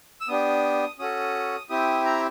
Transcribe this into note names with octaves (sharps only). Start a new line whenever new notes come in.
E6
B3 D4 G4 D#6
C#4 F#4 A4 D#6
C4 E4 G4 D#6
A#5